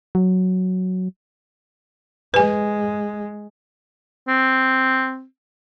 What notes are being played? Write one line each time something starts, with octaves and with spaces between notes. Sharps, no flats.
F#3
G#3 B4 G#5
C4